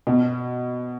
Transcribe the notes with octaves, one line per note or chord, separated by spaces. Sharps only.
B2